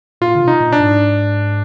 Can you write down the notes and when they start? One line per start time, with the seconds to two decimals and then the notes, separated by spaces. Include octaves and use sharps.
0.21 A#2 F4
0.35 D3
0.41 C3
0.48 D#4
0.60 A#2
0.72 D4
0.80 G#2